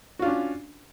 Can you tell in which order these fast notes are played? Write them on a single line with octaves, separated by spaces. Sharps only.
F#4 F4 D4 C#4